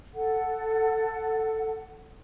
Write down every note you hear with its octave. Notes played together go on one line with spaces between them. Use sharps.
A4 F#5